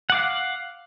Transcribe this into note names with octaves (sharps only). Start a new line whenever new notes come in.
F5 F#5 D6